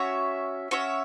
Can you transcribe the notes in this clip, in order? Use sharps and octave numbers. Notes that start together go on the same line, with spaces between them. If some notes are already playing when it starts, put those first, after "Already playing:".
Already playing: C#4 F#4 C#5 E5
C#4 F#4 C#5 E5